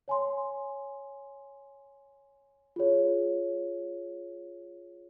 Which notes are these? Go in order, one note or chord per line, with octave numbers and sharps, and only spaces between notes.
C#5 G#5 C6
F4 G#4 C#5